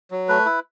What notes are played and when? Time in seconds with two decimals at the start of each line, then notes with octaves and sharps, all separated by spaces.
0.11 F#3
0.29 A3 B4
0.46 E4